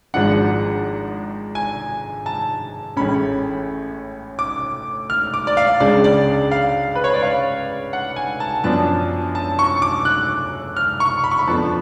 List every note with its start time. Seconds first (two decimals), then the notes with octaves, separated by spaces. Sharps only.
0.14 G#1 G#2 F3 G#3 D4 F#5
1.55 G#5
2.26 A5
2.97 A1 A2 G#3 C#4 B5
4.39 D6
5.10 F6
5.34 D6
5.47 D5
5.57 F5
5.80 C#2 C#3 G#3 D4 D5
6.04 D5
6.51 F5
6.95 B4
7.04 C#5
7.14 D5
7.23 F5
7.93 F#5
8.16 G#5
8.40 A5
8.64 F#2 F3 B3 D4 A5
9.35 A5
9.59 C#6
9.82 D6
10.05 F#6
10.77 F6
11.00 C#6
11.24 B5
11.31 C#6
11.39 B5
11.47 F2 F3 B3 D4 A5